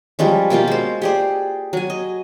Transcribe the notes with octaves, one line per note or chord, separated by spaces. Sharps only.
F3 G3 G#3 C#4
B2 A#3 F4 G4
G#3 C5
G4 G#4 D5
F#3 G#5
D#5